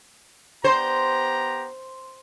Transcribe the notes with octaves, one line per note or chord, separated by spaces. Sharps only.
B3 G4 C5 A#5